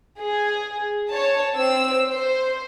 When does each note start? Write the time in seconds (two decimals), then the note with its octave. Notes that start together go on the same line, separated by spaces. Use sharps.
0.20 G#4
1.09 C#5 A5
1.54 C4 E6
2.10 C5